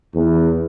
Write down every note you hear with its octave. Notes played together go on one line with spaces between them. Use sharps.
E2